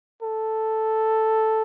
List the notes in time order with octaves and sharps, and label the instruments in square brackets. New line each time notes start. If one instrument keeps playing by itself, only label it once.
[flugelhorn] A4